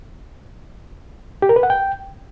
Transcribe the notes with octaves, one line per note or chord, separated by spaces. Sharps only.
G4
A#4
B4
F#5
G5